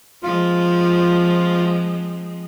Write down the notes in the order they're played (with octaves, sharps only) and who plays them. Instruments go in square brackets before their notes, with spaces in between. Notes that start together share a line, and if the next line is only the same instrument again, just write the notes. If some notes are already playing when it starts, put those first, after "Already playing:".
[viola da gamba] F3 G#3 C4 [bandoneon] F4